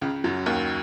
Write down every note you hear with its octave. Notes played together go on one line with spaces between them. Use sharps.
C#2 C#3
F#2 F#3
D#2 D#3